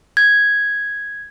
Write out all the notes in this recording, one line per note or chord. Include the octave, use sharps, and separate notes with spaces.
G#6